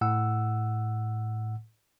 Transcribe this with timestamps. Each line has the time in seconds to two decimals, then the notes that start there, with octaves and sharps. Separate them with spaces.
0.01 A2 F#5 E6